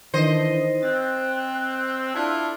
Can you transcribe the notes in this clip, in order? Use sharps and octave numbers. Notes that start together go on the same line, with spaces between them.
D#3 E3 D4 E4 C5 D#5
C4 F#6 A6
D4 E4 F4 A4